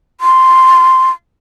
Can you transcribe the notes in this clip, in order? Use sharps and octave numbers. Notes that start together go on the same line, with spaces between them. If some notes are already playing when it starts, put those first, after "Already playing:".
C6